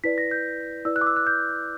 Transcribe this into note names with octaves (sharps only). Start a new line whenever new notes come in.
E4 B4 D5 B6
A#6
G6
E4 B4 D5 E6
F#6
D6
E6
F#6
G6